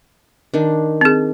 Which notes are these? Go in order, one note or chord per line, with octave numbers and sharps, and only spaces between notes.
D#3 D4
C4 G#4